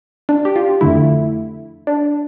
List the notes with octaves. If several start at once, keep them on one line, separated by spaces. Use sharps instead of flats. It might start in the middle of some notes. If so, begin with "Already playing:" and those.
D4
G4
F4
F2 D3 A3 E4
D4